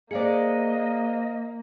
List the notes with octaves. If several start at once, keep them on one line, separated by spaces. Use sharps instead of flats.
A#3 G#4 C5 D5 D#5 F5 C#7